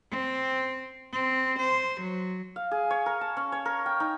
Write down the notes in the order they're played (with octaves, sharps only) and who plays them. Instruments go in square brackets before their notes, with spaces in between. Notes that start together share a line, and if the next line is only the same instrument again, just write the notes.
[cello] C4
C4
C5
F#3
[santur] F5
G#4
C#5
A#4
A5
C#4
C#5
A#4
G5
D#4